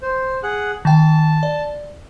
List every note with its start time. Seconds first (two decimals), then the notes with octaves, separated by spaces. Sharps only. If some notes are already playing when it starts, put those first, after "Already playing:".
0.02 C5
0.43 G#4 F#5 F#6
0.85 D#3 G5 A5
1.43 D5